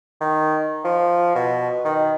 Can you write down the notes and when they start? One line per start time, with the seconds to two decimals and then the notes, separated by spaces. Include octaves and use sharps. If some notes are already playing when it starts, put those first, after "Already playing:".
0.21 D#3
0.84 F3
1.35 B2
1.85 D#3